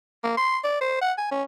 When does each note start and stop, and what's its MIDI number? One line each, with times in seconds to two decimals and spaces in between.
0.24 0.33 58
0.37 0.59 84
0.64 0.79 74
0.81 0.99 72
1.01 1.13 78
1.18 1.30 80
1.32 1.43 61